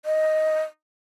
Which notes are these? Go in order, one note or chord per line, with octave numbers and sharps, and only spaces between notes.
D#5